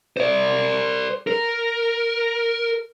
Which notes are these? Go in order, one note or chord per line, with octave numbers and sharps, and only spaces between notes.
C5 D5
A#4